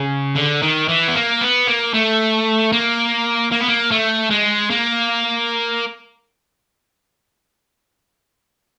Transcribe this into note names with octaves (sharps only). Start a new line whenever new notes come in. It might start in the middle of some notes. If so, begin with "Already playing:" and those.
Already playing: C#3
D3
D#3
E3
B3
A#3
B3
A#3
A3
A#3
A#3
B3
A#3
A3
G#3
A#3